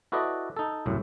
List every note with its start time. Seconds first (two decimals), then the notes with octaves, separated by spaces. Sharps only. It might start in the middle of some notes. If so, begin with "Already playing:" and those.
0.12 E4 F#4 A4 B4 D5 D#5
0.57 D#4 A4
0.86 C2 F#2 A2